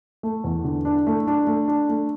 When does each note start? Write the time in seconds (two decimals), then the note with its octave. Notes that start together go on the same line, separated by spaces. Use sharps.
0.23 A3
0.44 E2
0.64 D3
0.85 D4
1.07 A3
1.27 D4
1.47 A3
1.68 D4
1.89 A3